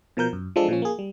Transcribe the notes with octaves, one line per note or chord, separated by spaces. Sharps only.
B2 F3 A#4 G6
F#2
F3 G#3 D4 A4
A#2 F3 C#4
A#3 G#4
G3